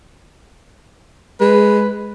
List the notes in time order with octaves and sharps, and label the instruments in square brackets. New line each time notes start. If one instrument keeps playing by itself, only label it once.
[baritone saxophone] G#3 [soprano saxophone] B4